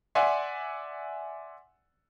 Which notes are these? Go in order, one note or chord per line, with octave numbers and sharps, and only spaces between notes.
D5 E5 F#5 G#5 C6